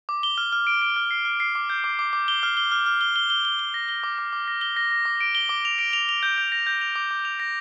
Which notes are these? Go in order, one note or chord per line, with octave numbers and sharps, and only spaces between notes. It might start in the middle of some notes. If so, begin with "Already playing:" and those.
D6
G7
F6
F6
D7
D7
F6
C7
F6
C7
D6
G6
D6
D6
D6
G7
F6
G7
F6
F6
G7
G7
G7
G7
G7
A#6
G7
D6
D6
D6
A#6
G7
A#6
A#6
D6
D7
G7
D6
F7
D7
F7
F7
G6
G6
A#6
G6
F7
D6
D6
F7
A#6